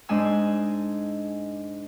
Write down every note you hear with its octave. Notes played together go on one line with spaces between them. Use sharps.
G#2 G#3 D4 G#5 E6